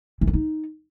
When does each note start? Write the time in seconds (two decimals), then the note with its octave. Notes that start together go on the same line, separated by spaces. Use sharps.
0.21 E3
0.27 C4
0.33 D#4